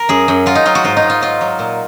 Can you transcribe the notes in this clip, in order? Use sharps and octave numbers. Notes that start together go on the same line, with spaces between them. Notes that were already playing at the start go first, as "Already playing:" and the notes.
Already playing: D#4 A#4
F#2 G#4
F#2
F#3 F4
D#4
F#3 F4
F#4
G#2 F4
D#4
G#2
F4
F#3 F4
F#3
A#2